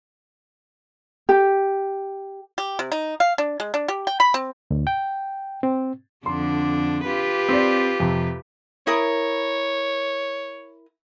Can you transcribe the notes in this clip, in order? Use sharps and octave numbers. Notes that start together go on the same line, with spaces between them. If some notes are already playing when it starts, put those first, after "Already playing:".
G4
G4
C3
D#4
F5
D4
G#3
D4
G4
G5
B5
C4
D2
G5
C4
F2 D3 D4 C6
F4 G4 B4
C4 D5
F2 C3
E4 A#4 C#5 D#6